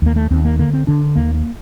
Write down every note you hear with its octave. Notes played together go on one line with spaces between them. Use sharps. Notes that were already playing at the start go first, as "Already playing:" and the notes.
D#2 A#3
A3
D#2 C4
A#3
D3 A#3
C4
D3 D4
D#2 A#3
A#3